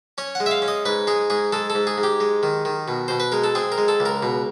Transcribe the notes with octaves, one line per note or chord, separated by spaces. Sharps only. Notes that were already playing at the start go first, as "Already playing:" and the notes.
C#4 C#5
G#3 F#5
E5
F5
C#4
D#5
G#2 B4
G#3 G#4
G#2 G#4
G#3 A4
A4
G#2
G#4
G#2
G4
G#3
D#3
D#3
B2
B2 C5
B4
G#3 A#4
A4
C4 G#4
A#4
G#3
A4
C#2
A#4
B2